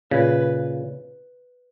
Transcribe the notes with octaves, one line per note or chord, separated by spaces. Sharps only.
A#2 C#3 B4